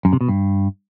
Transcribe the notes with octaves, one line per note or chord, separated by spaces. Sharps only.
F#2
C3
B2
G2